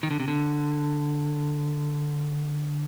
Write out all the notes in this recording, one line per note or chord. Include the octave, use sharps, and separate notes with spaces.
D#3
D3
C3
D3